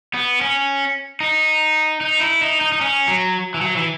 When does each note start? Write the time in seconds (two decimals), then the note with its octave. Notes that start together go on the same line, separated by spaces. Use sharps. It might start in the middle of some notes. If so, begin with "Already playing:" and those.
0.14 B3
0.41 C#4
1.20 D#4
2.01 D#4
2.20 E4
2.41 D#4
2.61 D#4
2.72 D#4
2.81 C#4
3.08 F#3
3.54 E3
3.61 F#3
3.76 E3